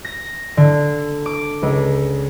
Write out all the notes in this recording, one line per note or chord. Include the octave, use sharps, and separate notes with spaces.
A#6
D3
D6
C#2